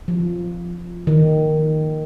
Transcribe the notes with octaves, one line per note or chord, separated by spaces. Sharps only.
F3
D#3